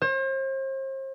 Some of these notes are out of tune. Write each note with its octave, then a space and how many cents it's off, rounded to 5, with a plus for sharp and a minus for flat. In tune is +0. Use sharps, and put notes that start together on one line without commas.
C5 +40